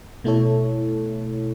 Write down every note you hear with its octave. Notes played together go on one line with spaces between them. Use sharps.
B2 A3 E4 A4 C#5